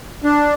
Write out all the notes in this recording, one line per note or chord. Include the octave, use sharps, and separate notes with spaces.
D4